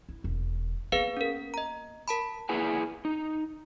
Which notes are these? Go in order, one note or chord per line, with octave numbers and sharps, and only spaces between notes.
E4
E1
A#3 B3 G#4 B4 F5
C#4 A#4
D#5 A#5
A#4 A5 B5
A#3 E4 G#4 B4 F#5 G#5
D#4